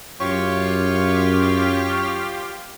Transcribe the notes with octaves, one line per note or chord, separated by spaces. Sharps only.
F#2 F4 G4 C#5 F5 C#6